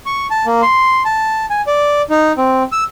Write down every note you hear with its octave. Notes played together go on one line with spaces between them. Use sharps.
C#6
A5
A#3
C6
A5
G#5
D5
D#4
C4
E6